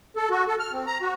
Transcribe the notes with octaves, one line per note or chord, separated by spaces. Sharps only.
A4
F#4
A4
F6
C4
A#5
F#4